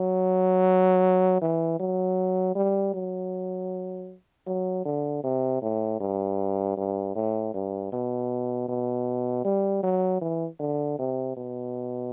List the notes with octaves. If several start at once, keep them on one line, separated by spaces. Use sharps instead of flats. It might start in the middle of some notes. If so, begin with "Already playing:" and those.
Already playing: F#3
E3
F#3
G3
F#3
F#3
D3
C3
A2
G2
G2
A2
G2
B2
B2
G3
F#3
E3
D3
C3
B2